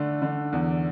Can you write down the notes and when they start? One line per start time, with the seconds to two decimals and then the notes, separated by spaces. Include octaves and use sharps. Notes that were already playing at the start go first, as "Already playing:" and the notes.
Already playing: D3 A3 D4
0.22 D3
0.53 E2